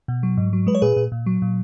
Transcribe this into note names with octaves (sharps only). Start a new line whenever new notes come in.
B2
F#3
G#2
F#3
G#3 B4
C#5
A#2 G#4 B4
A#2
A#2
F#3
A#2